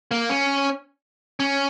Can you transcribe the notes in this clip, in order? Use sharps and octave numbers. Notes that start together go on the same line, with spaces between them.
A#3
C#4
C#4